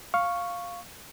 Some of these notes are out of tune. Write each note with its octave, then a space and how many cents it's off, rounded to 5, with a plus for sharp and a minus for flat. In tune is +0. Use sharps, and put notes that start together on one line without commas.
F5 +0 C#6 +0